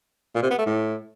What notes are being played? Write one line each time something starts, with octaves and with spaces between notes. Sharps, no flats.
A#2
C3
B3
A3
A2